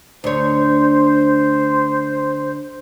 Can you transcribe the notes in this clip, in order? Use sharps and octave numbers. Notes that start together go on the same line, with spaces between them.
D2 C5 C#5